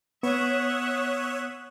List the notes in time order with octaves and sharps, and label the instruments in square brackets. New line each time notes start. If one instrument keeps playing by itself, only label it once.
[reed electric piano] B3 [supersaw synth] C#5 D#6 [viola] E5 F#5